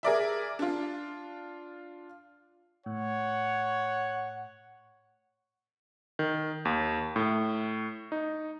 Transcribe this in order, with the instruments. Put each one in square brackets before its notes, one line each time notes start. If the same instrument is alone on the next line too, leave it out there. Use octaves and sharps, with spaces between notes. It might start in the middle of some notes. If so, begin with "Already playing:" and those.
[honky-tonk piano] G#4 A#4 D5 E5
D4 F4
[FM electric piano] A2 [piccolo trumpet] C#5 [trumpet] F#5
[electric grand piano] D#3
D#2
A2
D#4